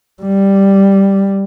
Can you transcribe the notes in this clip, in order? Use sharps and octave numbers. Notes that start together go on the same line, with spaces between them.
G3